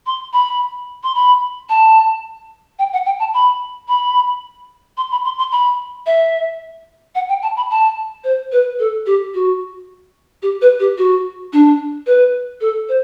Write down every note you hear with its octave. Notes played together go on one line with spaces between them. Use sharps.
C6
B5
C6
B5
A5
G5
F#5
G5
A5
B5
B5
C6
B5
C6
C6
B5
E5
F#5
G5
A5
B5
A5
C5
B4
A4
G4
F#4
G4
B4
G4
F#4
D4
B4
A4
C5